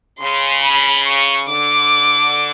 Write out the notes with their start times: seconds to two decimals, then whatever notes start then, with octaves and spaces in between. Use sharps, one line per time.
0.19 C#3 C6
0.63 B5
1.06 C#6
1.49 D3 D6